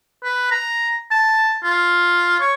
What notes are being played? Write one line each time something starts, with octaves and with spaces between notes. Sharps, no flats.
B4
A#5
A5
F4
C#5